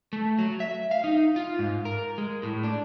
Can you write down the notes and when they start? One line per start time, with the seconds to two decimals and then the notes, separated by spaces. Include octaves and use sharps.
0.13 A3
0.39 F#3
0.60 E5
0.91 F5
1.04 D#4
1.36 F4
1.59 G#2
1.85 A#4
2.18 G#3
2.43 A2
2.63 D4